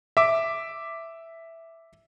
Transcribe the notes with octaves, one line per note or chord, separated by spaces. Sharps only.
E5 D6